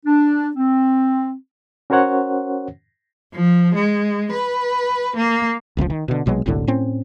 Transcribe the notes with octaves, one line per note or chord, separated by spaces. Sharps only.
D4
C4
C#4 F#4 A#4 C5 C#5 F#5
F3
G#3
B4
A#3
E1 C#2 E3 F3
D#3
B2 D3
A#1 B2 F#3 G#3
F#1 C2 A2 D3
A2 C4 C#4